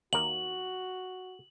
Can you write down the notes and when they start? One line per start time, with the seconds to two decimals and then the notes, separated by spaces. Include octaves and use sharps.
0.13 D#2 F#4 A#4 F#7